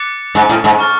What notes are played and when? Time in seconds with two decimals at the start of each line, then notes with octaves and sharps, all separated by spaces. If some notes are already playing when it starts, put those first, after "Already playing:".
Already playing: D6 F#6 A6 C#7
0.34 G#2 D6 F#6 A6
0.49 A2
0.64 G#2
0.79 C#6 F6 A6